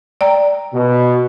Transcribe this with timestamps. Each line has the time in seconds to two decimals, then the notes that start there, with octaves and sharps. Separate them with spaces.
0.21 D5 G5 A#5
0.74 B2